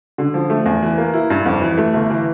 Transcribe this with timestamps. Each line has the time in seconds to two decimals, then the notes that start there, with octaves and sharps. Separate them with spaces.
0.18 D3
0.34 F3
0.50 A3
0.66 E2
0.83 E3
0.98 A#3
1.14 E4
1.30 G2
1.46 F2
1.61 E3
1.78 A3
1.94 G1
2.10 E3